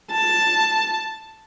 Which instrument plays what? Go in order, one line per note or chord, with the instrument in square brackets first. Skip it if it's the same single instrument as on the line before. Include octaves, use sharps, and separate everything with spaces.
[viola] A5